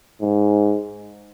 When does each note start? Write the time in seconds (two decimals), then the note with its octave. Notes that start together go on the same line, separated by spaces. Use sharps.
0.21 G#2